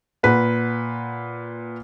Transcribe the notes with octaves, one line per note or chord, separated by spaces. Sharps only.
A#2 B4 F#5